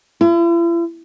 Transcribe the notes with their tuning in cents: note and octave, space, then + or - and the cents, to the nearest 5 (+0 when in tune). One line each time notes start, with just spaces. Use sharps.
E4 +45